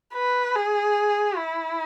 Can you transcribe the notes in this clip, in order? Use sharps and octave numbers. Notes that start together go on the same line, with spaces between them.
B4
G#4
E4